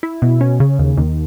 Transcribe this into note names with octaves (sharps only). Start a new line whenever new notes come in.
E4
B2
C#4
C#3
D#2
D#2